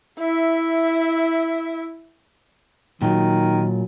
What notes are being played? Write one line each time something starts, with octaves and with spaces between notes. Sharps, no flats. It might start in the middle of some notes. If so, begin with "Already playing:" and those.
E4 E5
A#2 D#3 F#3